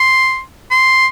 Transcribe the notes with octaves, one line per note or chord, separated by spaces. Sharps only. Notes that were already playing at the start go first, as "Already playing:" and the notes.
Already playing: C6
C6